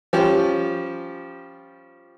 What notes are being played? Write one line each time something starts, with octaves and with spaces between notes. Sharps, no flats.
F3 G3 C#4 G4